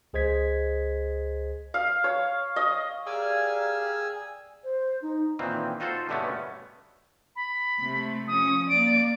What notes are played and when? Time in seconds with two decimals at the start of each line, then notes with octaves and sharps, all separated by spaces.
0.13 C#2 G#4 C5 D#5 G#6 B6
1.74 F5
2.04 C#5
2.56 D#5
3.07 G4 G#4 A#4 D5 F5 G#5 E6
4.64 C5
5.02 D#4
5.39 A#2 D#3 E3 C4
5.80 D#4 F4 F#4 A4 C5
6.09 G2 B2 D3 A3 B3 C#4
7.36 B5
7.79 C3 A3
8.28 F3 C#4 D#6
8.69 A#3 D5 D7